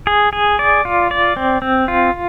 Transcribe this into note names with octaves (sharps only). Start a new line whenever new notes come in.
G#4
G#4
D5
F4
D5
C4
C4
F4